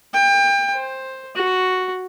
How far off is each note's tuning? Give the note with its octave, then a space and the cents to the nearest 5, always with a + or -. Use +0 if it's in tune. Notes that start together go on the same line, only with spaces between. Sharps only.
G5 +30
C5 +10
F#4 +0